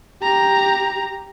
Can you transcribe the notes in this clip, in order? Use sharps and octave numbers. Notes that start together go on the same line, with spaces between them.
G4 A#5